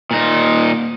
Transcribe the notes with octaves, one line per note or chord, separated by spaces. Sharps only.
A#2 D#4